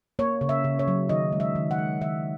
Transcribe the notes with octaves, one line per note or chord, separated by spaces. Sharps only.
A#3 C#5
C#3
E5
C#3
C#5
F#3
D#3 D#5
G#3
E5
D#3
F#5
G#3
D#3 E5